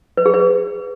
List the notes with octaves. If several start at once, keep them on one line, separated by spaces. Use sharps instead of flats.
B4
G#4
B4